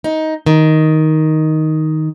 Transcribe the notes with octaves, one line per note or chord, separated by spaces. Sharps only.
D#4
D#3